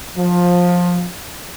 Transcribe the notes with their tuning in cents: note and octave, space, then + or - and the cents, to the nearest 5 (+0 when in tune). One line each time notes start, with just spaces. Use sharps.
F3 +20